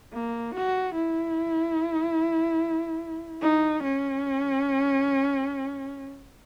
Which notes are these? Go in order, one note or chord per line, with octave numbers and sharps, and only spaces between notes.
A#3
F#4
E4
D#4
C#4